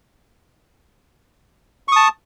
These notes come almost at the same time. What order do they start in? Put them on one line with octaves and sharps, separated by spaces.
C#6 D#6 A5